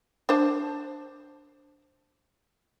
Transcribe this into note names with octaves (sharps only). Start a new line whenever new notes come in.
D4 C5 A5